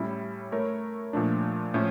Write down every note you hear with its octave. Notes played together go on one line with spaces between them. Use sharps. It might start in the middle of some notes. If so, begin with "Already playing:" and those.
Already playing: A2 G3 C#4 E4
A3 E4 A#4 C#5
A#2 F3 A3 D4
A2 F3 A3 C#4